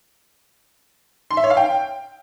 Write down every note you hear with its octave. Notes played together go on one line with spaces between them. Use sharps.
C6
E5
C#5
F5
G5